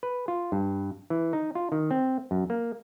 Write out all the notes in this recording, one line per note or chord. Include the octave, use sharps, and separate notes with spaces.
B4
F4
G2
E3
D#4
F4
D#3
C4
F#2
A#3